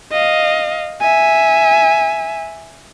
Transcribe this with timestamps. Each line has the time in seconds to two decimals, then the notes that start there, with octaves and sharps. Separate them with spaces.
0.12 D#5 F5
1.01 E5 G#5